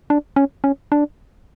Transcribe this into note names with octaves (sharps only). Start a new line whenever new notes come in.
D4
C#4
C#4
D4